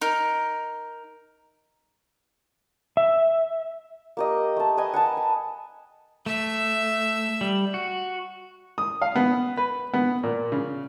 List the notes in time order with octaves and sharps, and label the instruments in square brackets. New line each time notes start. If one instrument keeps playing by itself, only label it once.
[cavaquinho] D#4 A#4
[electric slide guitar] E5
[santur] A#3 G4 D#5
A3 A5
B4 D#5 G#5
F#5 G#5 A5 B5
B5
[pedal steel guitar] A3 [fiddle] E5 E6
[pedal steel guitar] G3
F#4
[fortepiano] D#6
F5
B3
B4
B3
A#2
C#3